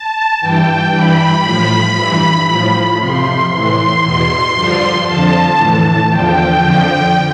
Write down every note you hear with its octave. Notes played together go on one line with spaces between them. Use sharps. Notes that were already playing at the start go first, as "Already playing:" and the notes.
Already playing: A5
G2 E3 G5
G2 E3 B5
A2 F3 B5
G2 E3
A2 F3
F2 C3 F3 C6
A2 E3 C6
E2 B2 C6
G2 D3 F3
F2 D3 F3 A5
A2 E3
E2 D3 F3 G5
F2 D3 F3